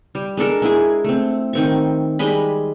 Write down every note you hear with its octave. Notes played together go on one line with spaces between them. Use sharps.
G3
G#3 D4 A4 A#4
G#3 E4 G#4
A3 C4
D#3 C4 C#6
G3 G#3 D#5 B5